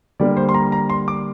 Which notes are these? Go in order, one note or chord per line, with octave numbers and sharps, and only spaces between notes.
D3 G3 A#3 D5
C5
C6
A#5
A#5
C6
D6